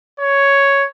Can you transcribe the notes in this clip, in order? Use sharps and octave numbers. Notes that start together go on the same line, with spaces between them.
C#5